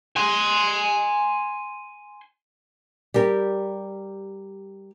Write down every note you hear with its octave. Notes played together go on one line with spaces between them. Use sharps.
G#5 C6
G3 G4 A#4